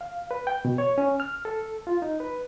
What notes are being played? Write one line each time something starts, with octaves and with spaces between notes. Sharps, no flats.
F5
B4
G5
B2
C#5
C#4
F6
A4
F4
D#4
B4